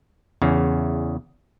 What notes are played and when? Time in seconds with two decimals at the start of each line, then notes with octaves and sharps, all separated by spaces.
0.42 E2 C#3